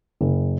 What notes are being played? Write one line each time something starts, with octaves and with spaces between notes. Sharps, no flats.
F#1